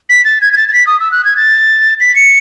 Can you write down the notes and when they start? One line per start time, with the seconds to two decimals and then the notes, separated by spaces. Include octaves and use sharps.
0.09 B6
0.25 A6
0.41 G#6
0.53 G#6
0.57 A6
0.69 A6
0.73 B6
0.87 D#6
1.00 E6
1.12 F#6
1.25 G#6
1.37 A6
2.00 B6
2.15 C#7